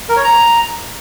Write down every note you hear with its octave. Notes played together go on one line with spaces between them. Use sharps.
A#4
C#5
A#5